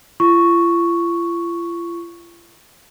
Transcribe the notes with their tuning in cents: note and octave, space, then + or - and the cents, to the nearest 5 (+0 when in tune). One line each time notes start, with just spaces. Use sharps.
F4 -45 C#6 +0